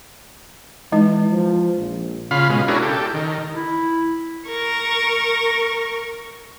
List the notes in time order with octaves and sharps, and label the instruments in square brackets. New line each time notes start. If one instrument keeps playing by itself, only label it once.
[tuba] E3 [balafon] G#3 D#4
[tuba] F3
A#1
[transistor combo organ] C#3 F4 F5 B5
B2 G#3
C#4 D4 E4 F#4 G#4 A#4
G4 A4
D#3
[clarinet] E4
[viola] A#4 C#6